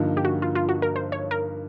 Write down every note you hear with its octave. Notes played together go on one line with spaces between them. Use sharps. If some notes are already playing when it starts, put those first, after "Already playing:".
Already playing: G2 D3 F3 A#3 D#4
G4
F#4
F4
F4
F#4
A#4
C5
C#5
A#4